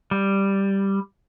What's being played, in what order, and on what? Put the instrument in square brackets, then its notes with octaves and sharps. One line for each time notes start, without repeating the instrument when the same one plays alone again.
[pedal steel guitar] G3